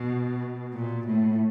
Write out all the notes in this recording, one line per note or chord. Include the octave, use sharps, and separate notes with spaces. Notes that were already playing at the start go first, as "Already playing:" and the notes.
Already playing: B2
A#2
A2